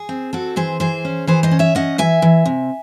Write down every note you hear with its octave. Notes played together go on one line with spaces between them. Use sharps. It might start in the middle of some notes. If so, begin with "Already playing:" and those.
Already playing: G#4
C4
C4 F#4 A4
E3 G#4 C5
E3 G#4 C5
C#4
E3 G#4 C5
C5 D#5
C#4
C#5 E5
C#4 D#5 F#5
E3 E5 G#5
E3
C3